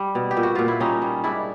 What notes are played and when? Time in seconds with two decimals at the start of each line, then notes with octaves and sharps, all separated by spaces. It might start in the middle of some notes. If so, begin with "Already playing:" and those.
Already playing: G3
0.15 B2
0.31 G4
0.37 A#2
0.43 F#4
0.55 A#2 F4
0.68 E4
0.80 G3 C#4 D#4
1.02 G3
1.24 G#2 D4 E4